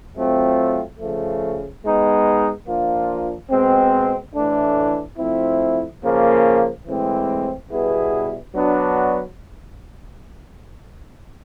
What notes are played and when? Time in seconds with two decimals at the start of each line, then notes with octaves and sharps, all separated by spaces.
0.15 F#3 A3 C4 F4
0.99 C#3 F3 A3
1.83 G#3 B3 D#4
2.67 F3 A#3 D4 F4
3.50 B2 G#3 C4
4.35 A2 E3 A3 D4
5.18 F3 A3 C4 E4
6.02 C#3 F3 A#3
6.87 A2 E3 G#3 C4
7.70 B2 G3 B3 E4 G#4
8.54 F#3 B3 D4 F#4